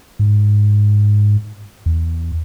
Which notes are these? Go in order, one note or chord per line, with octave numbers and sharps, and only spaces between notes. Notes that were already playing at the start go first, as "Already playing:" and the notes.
G#2
E2